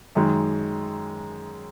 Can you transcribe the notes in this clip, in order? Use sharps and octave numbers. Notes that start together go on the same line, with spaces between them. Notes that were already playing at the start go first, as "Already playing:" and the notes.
F#2 D#3 G#3